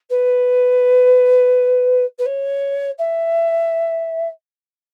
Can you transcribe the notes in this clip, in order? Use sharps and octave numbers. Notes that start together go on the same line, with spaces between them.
B4
B4
C#5
E5